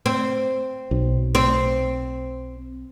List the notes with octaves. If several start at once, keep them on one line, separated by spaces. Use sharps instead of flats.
C4
B1
C4